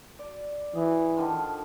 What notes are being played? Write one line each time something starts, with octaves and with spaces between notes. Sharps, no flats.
D5
E3 G#4
D3 D#3 F3